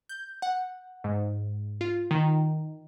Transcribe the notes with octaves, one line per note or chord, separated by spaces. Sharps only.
G6
F#5
G#2
F4
D#3